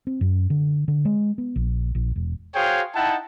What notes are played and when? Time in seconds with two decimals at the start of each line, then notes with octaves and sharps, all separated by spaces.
0.07 C4
0.21 F#2
0.50 D3
0.88 D3
1.05 G#3
1.38 B3
1.56 A#1
1.95 A#1
2.16 E1
2.55 F#4 G#4 C5 C#5 F5 G5
2.95 D#4 E4 F#5 G5 A5